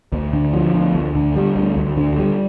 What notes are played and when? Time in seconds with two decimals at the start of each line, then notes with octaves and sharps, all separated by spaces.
0.12 D2
0.33 D3
0.53 F3
0.74 D2
0.94 D2
1.15 D3
1.36 G3
1.56 D2
1.77 D2
1.97 D3
2.18 G3